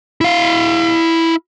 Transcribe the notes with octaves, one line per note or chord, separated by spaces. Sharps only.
E4 F5